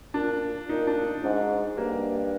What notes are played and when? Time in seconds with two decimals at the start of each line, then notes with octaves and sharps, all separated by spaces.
0.14 A#2 D4
0.69 A#2 D#4
0.87 D4
1.24 G#2 D4
1.77 G2 A#3